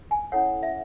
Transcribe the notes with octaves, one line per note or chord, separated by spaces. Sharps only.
G#5
C#4 E4 A4 C#5 F#5
E5